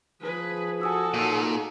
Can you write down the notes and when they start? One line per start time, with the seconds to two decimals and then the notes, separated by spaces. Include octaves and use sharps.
0.22 F3 G#4 B4
0.81 F#4 A4 G#5 D#6 E6
1.14 A#2 F#3 D#4